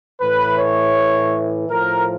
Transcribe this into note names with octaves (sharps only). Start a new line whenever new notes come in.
A2 E3 B4
C#5
A2 F3 A#4